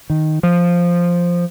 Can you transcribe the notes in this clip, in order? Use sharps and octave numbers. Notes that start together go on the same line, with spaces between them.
D#3
F3